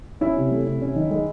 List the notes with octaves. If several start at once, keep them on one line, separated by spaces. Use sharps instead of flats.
C#4 E4
C3
A3
C3
C#4
D#3
G#3